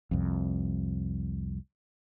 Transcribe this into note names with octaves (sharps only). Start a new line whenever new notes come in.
C2 F2